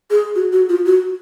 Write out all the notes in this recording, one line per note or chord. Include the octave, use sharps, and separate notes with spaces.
G#4
F#4
F#4
F4
F#4